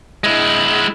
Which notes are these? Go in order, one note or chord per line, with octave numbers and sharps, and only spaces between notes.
G#3 E4